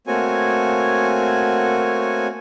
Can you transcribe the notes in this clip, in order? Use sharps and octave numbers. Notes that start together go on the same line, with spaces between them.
A3 A#3 C4 F#4 C#5 G#5